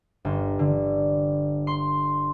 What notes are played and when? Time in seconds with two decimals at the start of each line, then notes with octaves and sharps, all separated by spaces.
0.25 G1
0.59 D3
1.67 C6